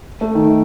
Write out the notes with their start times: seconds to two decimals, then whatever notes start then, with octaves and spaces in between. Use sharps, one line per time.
0.21 A3
0.35 D#3